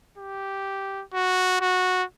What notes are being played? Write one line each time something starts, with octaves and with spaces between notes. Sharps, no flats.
G4
F#4
F#4